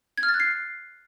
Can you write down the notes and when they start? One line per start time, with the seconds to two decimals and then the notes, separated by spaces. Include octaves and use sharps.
0.18 G#6
0.23 F6
0.29 A6
0.34 F#6
0.40 C7